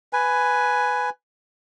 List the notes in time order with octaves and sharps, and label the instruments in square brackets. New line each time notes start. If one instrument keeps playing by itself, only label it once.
[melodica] B4 G#5